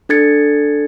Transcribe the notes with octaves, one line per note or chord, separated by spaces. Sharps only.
D4 A4 G#6 A6 C#7